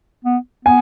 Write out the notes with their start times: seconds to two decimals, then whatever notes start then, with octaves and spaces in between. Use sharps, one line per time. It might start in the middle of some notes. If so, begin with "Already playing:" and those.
0.25 B3
0.65 B3 G#5